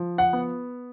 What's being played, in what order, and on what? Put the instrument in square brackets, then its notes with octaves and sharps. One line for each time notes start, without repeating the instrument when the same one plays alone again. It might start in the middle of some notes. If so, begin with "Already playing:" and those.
Already playing: [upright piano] F3
F#5
B3